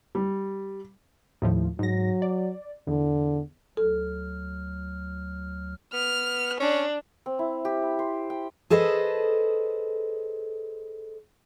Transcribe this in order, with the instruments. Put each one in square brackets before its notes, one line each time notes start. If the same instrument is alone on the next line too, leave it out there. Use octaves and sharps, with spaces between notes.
[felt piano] G3
[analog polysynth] D#2 A2 F3
[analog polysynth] G#2 A#6 [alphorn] F#3
[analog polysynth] D5
[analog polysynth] E2 [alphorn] D3
[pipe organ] D2 F#3 F6 [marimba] A4
[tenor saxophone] B3 [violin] F6
[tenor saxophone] C#4 [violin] D4
[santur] C4
E4
G4
B5
C5
G5
[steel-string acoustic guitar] G#4 A4 B4 C5 D#5